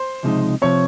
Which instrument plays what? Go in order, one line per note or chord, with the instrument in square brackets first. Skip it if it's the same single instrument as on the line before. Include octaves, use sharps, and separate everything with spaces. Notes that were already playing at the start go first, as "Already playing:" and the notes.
Already playing: [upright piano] C5 C6
[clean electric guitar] C#2 C3 F3 G#3 D#4
[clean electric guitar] C3 F3 C4 [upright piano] C#5 C#6